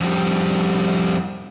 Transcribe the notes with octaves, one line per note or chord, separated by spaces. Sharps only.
F2 G3